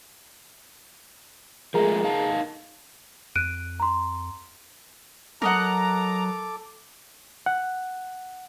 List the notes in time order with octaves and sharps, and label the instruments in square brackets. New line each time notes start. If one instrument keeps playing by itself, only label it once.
[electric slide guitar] F3 G#3 A3 [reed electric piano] G#4 A#4 A#5
[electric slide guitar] D#4 F5 A5
[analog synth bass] F2 [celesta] F#6 D7 D#7
[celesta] A#5 C6
[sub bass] F#3 [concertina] A4 D6 [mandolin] A#4 D#5 F#5 [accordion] A#5
[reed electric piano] F#5